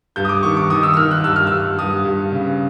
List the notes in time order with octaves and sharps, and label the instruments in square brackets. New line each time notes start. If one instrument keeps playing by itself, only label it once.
[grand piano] G2 G6
D#6
D6
D#3 C#6
D6
D#3 D#6
E6
E6
D#3 F6
F#6
G2 E6
F6
G2 E6
G2 D#6
G2
C#3